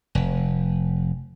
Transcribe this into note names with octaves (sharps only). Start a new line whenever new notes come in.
F1